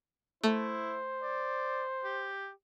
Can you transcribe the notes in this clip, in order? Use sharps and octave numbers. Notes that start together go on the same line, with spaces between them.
A3 E4 C5
D5
G4